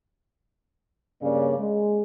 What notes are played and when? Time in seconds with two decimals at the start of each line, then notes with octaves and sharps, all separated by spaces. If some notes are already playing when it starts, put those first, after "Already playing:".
1.22 G2 C#3 A#3 C#5 D5
1.59 G#3